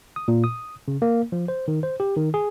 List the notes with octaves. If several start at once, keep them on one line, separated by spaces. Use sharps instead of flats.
D#6
A#2
D#6
C#3
A#3
F3
C5
D#3
C5
G4
D#3
G#4